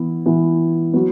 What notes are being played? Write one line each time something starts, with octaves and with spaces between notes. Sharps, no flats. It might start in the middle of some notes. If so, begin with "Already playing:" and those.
Already playing: E3 B3 E4
E3 B3 E4
F#3 B3